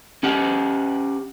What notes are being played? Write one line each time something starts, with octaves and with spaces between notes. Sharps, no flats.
C#4 G4 F#5